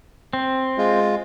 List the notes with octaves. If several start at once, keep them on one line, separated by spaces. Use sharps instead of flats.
C4
G#3 F4